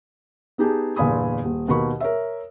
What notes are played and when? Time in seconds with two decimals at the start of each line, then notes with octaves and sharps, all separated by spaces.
0.58 B3 D#4 G4 G#4 A5
0.96 G1 E2 A#2 G#5 B5 D#6
1.44 D#1
1.68 D#2 B2 A#4 B5 C#6
2.00 A#4 C#5 E5